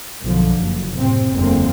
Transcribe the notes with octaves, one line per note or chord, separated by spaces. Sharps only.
B1 F#2 D3 F3
F#1
A2 C3 C4
F#1 E2 D3 G#3 A#3 C4